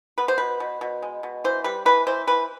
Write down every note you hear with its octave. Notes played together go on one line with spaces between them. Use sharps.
B3 B4
C5
B2 B4
B2
B2
G#3
B2
E3 C5
G3 B4
E3 B4
E3 C5
E3 B4